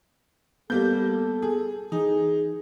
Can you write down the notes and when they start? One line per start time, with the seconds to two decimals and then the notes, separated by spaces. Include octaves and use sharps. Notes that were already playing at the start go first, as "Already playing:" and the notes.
0.70 G3 A#3 B3 A4 G6
1.42 G#4
1.92 E3 D#4 G#4